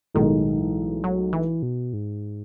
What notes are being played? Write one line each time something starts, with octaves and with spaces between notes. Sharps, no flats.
B1 A2 D#3 G#3 D#4 A4
E3
F#3
E3
B2
G#2